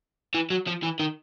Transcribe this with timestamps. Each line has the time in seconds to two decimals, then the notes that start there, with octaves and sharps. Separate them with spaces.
0.34 E3
0.50 F#3
0.67 F3
0.83 E3
1.00 D#3